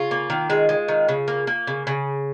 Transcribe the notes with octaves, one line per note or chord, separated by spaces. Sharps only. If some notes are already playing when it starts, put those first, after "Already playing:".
Already playing: C#3 F4
A#3
D#3
G#3
G#3
D#3
C#3
A#3
A#3
C#3
C#3